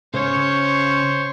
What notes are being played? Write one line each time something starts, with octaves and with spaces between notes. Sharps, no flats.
C#3 C5 C#5 C6